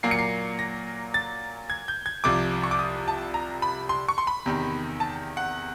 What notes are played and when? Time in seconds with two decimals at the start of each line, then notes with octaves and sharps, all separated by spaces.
0.03 A#2 F#3 A#3 C7
0.11 C#7
0.19 C7
0.59 A#6
1.14 A6
1.70 G#6
1.88 G6
2.06 G#6
2.24 C2 C3 F3 D6
2.63 C#6
2.71 D6
2.79 D#6
3.08 A5
3.34 A#5
3.62 B5
3.89 C6
4.08 C#6
4.18 C6
4.27 B5
4.46 E2 C3 D#3
5.00 A5
5.37 F#5